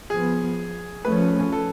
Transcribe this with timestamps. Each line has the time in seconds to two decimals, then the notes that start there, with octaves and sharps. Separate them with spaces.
0.10 F3 B3 G#4
1.05 F3 A3 C#4 B4
1.52 A4